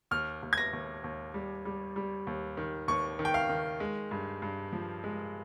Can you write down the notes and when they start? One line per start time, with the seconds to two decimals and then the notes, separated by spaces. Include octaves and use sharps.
0.11 D#2 F6
0.43 D#2
0.53 G#6
0.58 A#6
0.73 D#2
1.04 D#2
1.34 G3
1.65 G3
1.96 G3
2.27 D#2
2.57 D#3
2.88 D#2 C#6
3.19 D#3
3.25 G5
3.34 F5
3.49 D#3
3.80 G#3
4.11 G2
4.42 G2
4.73 F3
5.04 G#3